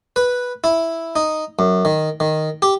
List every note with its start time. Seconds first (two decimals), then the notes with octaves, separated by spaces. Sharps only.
0.16 B4
0.64 E4
1.16 D#4
1.59 F#2
1.85 D#3
2.20 D#3
2.62 G4